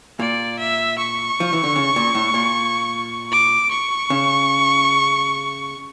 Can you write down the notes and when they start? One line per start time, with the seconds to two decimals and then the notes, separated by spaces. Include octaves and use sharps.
0.20 A#2 D5
0.59 E5
0.98 C#6
1.40 F3
1.53 E3
1.64 D3
1.76 C#3
1.96 A#2
2.15 A2
2.34 A#2
3.32 D6
3.71 C#6
4.10 C#3